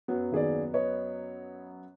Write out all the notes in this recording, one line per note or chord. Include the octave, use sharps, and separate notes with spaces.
F#2 F#3 B3
D#2 G#4 D5
B4 C#5 D#5